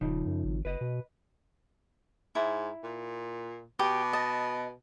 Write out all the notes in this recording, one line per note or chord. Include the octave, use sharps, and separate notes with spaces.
D#1 C#3 F3 D#4
F#2
G#1
F#1 B4 D#5
B2
G#2 E4
A#2
B2 G4
D#5 A5